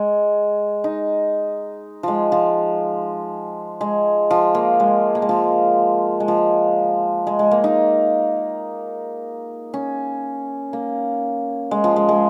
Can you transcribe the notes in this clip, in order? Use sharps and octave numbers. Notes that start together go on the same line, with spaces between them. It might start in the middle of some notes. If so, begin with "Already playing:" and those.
Already playing: G#3
D#4
F3 G#3
F3
G#3
F3
A#3
G#3
A#3
G#3
F3
G#3
F3
G#3
G#3
A#3
D#4
C#4
A#3
G#3
F3
G#3
G#3